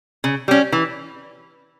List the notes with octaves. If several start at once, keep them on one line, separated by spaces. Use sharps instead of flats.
C#3
G3 C#4
E3